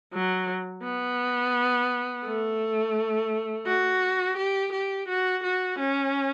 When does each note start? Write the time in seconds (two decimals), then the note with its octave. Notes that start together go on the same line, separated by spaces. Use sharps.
0.14 F#3
0.83 B3
2.26 A3
3.66 F#4
4.37 G4
4.72 G4
5.08 F#4
5.43 F#4
5.79 C#4